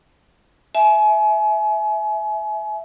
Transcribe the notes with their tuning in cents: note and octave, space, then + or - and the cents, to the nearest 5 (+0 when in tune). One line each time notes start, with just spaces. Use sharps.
E5 +0 G#5 +35